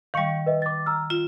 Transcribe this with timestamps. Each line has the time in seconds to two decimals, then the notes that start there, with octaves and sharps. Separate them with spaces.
0.14 D#3 G3 F5 C#6 C#7
0.46 B4 D#5 E5
0.62 D6 A6
0.86 A#5 E6 F6
1.10 F4 E7